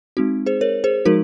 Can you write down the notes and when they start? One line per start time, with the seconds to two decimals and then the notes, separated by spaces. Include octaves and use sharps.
0.17 G#3 C4 D#4 F#4
0.46 G#4 C5
0.61 A#4 C#5
0.84 G#4 C5
1.05 F3 G#3 D#4 F#4 A#4